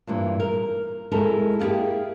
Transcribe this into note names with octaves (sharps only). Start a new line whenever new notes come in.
G2 A#2 E3
A#4
G#3 E4 A4 A#4
A#3 B3 E4 G4 G#4